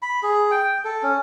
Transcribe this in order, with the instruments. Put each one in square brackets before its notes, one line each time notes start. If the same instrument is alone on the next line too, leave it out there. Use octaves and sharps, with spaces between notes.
[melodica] B5
G#4
G5
A4
C#4